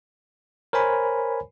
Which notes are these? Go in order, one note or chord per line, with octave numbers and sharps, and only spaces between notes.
A#4 C5 C#5 G#5 B5